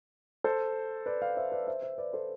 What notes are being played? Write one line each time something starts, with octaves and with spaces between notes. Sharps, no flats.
A4 C5
B4 D5
D5 F5
C5 E5
B4 D5
C5 E5
C5 E5
B4 D5
A4 C5